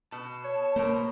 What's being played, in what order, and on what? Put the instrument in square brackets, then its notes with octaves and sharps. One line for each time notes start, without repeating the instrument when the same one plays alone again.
[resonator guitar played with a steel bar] B2 [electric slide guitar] A5
[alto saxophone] C#5
[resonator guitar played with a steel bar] B2 A#4 C5 [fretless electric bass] A#3